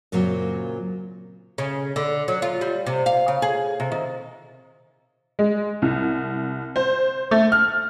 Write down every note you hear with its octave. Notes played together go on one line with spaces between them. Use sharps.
F#2 A#2 C#3 F#3 C4
C#3
D3
F#3
F4
G3
C3
F5
C#3
G#4
C3
D#3
G#3
C2
C5
A3
F6